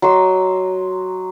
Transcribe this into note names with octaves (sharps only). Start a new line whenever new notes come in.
F#3 D#5 C6 E6